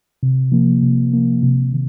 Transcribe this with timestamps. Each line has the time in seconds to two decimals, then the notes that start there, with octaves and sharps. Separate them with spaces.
0.23 C3
0.52 F3 A#3
0.82 C3
1.13 F3 A#3
1.43 C3
1.73 D#3